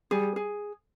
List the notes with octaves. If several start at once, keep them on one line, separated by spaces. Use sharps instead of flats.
G3 G#4
G#4